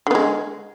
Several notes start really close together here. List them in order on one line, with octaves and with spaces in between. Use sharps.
D3 B3 G#3